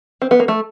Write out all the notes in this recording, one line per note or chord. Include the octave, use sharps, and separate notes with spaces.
C4
B3
A#3
A3